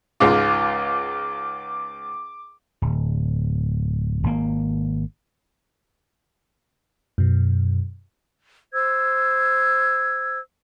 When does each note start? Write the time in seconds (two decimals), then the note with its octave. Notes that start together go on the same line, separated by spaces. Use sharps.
0.20 C#2 G#2 F4 D6
2.82 D1
4.23 G#1 A#3
7.18 F#2 B2
8.72 C5 E6 G#6